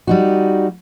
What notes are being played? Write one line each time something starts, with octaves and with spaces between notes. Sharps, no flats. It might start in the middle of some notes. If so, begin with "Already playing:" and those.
G3 D#4 F#4